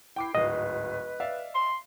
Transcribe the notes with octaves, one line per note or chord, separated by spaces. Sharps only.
E4 G5 D6 C7
D1 G#1 B4 D#5
D5 E5 F5
C6